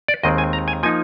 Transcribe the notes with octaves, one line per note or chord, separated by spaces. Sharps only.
D5
D#2 D#3 G#3 C4 D#5
G#5
A#5
G#5
F3 A#3 D#4 G#5